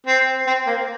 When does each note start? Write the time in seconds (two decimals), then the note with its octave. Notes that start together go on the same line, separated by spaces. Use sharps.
0.07 C4
0.47 C4
0.67 A#3